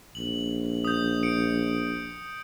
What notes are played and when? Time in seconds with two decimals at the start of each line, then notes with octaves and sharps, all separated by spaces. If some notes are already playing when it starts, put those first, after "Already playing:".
0.15 A#1 F#7
0.84 D#6 G6
1.23 C#7 D7